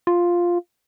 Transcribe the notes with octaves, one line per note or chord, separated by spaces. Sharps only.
F4